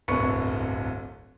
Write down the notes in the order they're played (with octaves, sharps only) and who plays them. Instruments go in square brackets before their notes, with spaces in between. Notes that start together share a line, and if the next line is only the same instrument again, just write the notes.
[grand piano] D1 G1 C2 B4 C#6 C#7